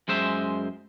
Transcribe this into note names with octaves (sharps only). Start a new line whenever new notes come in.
F#2 G#3 C5 E5